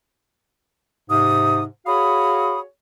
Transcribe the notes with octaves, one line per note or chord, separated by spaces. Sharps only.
G#2 C3 D#6
F#4 G#4 C#5 F5 B5 D#6